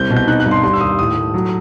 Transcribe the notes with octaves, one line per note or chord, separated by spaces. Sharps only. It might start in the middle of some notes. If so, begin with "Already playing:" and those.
Already playing: C2 C4 G6
B2
G6
D#4 F#6
F#6
G2
C6
G3 C6
E6
D#2 D#6
A2 D#6
A3
F#3